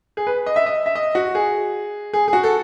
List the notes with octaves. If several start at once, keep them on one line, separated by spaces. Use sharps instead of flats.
G#4
B4
D#5
E5
D#5
E5
D#5
F#4
G#4
G#4
G#4
F#4
A4